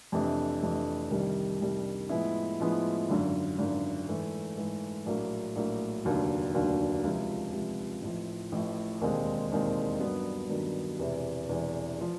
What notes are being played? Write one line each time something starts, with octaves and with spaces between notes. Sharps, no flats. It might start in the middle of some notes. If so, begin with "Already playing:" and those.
F2 C3 E3 A3 D4
F2 C3 E3 A3 D4
C2 C3 D#3 G3
C2 C3 D#3 G3
A2 F3 G#3 B3 E4
A2 F3 G#3 B3 E4
G#1 F#2 D3
G#1 F#2 D3
G#2 E3 A3
G#2 E3 A3
A#1 A2 F#3 A#3
A#1 A2 F#3 A#3
F1 D#2 D3 F#3
F1 D#2 D3 F#3
C#2 C3 F3
C#2 C3 F3
A1 A2 F3
A1 A2 F3
E1 D#2 D#3 G#3 C4
E1 D#2 D#3 G#3 C4
G2 D#3 F#3 B3
G2 D#3 F#3 B3
E1 E2 C3 E3
E1 E2 C3 E3
F3